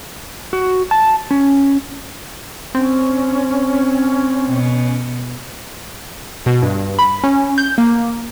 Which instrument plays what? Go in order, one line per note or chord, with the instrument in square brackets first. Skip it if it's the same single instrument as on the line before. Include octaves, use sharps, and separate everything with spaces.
[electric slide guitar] F#4
A5
C#4
[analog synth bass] C4 [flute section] C#4
[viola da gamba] B2
[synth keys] B2
G2
B5
C#4
G6
A#3